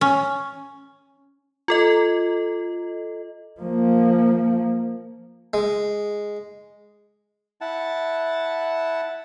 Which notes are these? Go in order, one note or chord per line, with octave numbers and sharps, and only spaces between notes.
C#4
F4 A4 D#5
F3 A#3
G#3
E4 F#5 A5